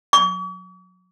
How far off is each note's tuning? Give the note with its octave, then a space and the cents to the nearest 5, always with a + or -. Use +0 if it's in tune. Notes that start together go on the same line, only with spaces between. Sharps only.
C#6 +45